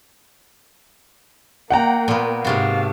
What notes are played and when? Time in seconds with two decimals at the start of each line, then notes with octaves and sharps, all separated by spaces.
1.70 A#3 F#5 G5 A#5
2.08 A#2 B3
2.45 G#2 C3 F#4 F5 A5